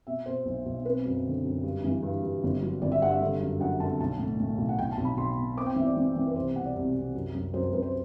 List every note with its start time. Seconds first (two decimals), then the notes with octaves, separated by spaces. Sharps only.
0.07 B2 E5
0.26 B2 C5
0.45 B1
0.66 B1
0.85 C4 B4
1.06 F#2
1.25 D3
1.45 F#2
1.63 G2
1.84 E3
2.03 G2
2.23 G2
2.43 G1
2.62 F#3
2.82 G1 D5
2.92 E5
3.02 G2 F#5
3.11 E5
3.21 D3
3.40 F#2
3.60 F#2 F#5
3.80 D3 A5
4.00 B1 A5
4.19 A2
4.40 A2
4.58 B1
4.69 F#5
4.79 B1 G5
4.92 A5
4.98 B1
5.05 B5
5.17 B1 C6
5.37 B2
5.57 C4 D6
5.66 G5
5.76 E3 E5
5.86 D5
5.97 E3
6.16 E3
6.27 B4
6.35 C2 C5
6.55 B2 F#5
6.66 D5
6.75 C2
6.94 C2
7.15 F#2
7.34 F#2
7.54 F#2 C5
7.64 C5
7.73 F#2 B4
7.82 C5